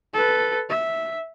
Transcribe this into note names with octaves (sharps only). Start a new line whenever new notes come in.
A4 B4
E5